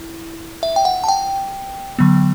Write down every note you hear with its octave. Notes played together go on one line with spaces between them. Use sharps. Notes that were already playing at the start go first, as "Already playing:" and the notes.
Already playing: E4
E5
G5
F#5
A5
G5
D3 F#3 B3